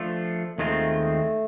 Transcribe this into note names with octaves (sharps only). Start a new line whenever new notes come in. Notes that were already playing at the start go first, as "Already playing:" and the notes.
Already playing: F3 A3 D4 F4
D#2 D#3 G#3 A3 C4 F4